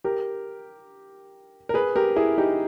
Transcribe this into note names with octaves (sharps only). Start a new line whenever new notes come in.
G4 A#4
A#4
G#4 B4
G4 A#4
E4 G#4
D#4 G4